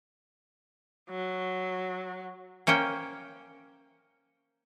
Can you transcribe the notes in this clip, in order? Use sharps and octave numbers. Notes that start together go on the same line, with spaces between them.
F#3
A#3 C#4 C5 G5